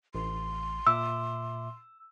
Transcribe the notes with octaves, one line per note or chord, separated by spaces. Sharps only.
A1 C6
A#2 E5 D6 E6